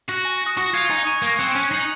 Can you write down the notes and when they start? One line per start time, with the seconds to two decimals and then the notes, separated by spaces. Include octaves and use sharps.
0.09 F#4 F#6 A#6
0.25 G#5
0.41 D#6 A#6
0.57 F#4 C#6
0.74 F4 G#6 C#7 F7
0.90 D#4 G#5
1.07 C#6 G#6 D#7
1.22 A#3 C#6
1.39 C4 F#6 C#7
1.55 C#4 F#6
1.71 D#4 C7 F#7